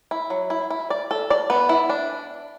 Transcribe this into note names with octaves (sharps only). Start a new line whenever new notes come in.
E4
F#3
E4
E4
D5
A4
D5
B3
E4
D4